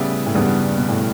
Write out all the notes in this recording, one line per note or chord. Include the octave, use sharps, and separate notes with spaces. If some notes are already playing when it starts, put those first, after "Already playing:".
Already playing: A2 C#3 G3 B3 E4 G4
A2
E2 G2 C#3 G3 B3
B2
A2